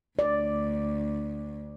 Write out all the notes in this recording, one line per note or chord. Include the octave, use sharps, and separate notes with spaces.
D2 D5